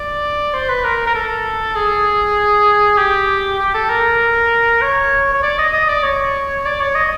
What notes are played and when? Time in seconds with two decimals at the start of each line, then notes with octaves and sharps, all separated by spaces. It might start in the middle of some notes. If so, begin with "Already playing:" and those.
Already playing: D5
0.54 C5
0.69 B4
0.84 A#4
1.07 A#4
1.15 A4
1.75 G#4
2.98 G4
3.59 G4
3.74 A4
3.90 A#4
4.82 C#5
5.34 C#5
5.43 D5
5.59 D#5
5.73 D#5
5.89 D5
6.03 C#5
6.65 D5
6.80 C#5
6.95 D#5